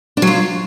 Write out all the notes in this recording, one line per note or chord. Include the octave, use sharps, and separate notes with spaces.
D4
F#3
F4